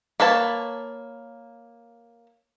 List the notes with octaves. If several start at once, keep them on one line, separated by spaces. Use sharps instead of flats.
A#3 B4 C#5 A5